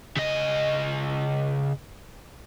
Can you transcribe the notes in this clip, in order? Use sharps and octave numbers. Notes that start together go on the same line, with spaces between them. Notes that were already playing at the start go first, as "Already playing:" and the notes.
C#3 D#5